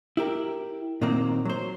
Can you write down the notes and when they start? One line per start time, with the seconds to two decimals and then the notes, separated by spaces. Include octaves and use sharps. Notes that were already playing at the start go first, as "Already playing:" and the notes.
0.17 E4 G4 A#4
1.01 A#2 D#3 F#3 A#3 C4
1.45 F#3 C5